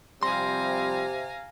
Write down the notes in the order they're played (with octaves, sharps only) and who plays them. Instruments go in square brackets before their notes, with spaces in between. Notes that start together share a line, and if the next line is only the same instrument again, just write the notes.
[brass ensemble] C3 [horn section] F3 G3 C4 [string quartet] F5 G#5 A#5 [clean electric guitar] C6